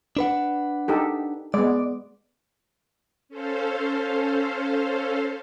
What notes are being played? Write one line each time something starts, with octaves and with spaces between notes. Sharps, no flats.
D4 B4 F#5
D#4 G4 A4
G#3 B3 D5
C#4 A4 C5 F5